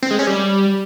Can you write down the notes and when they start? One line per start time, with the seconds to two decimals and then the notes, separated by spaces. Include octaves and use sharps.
0.02 C4
0.11 G#3
0.19 C#4
0.27 G3